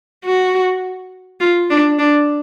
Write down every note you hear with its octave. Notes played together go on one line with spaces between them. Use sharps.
F#4
F4
D4
D4